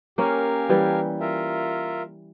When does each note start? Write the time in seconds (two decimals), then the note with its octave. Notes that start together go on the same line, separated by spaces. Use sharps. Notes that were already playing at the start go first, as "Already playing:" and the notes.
0.18 A#3 C#4 G4 A#4 F5 G#5
0.69 E3 G3
1.20 F4 A#4 E5